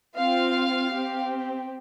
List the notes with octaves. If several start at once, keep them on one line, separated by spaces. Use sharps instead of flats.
C4 F4 F5
C4 G4